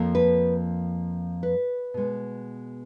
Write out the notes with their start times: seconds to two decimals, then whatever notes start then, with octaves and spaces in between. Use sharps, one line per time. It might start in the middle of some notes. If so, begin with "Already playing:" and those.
Already playing: F2 F3 A#3
0.15 B4
1.43 B4
1.94 B2 G#3 B3